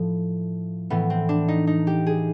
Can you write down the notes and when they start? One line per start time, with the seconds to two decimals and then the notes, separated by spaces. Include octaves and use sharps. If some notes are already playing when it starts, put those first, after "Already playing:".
Already playing: A2 F3
0.90 A2 E3 B3
1.10 C4
1.29 D4
1.48 D#4
1.67 D#4
1.87 G4
2.06 G#4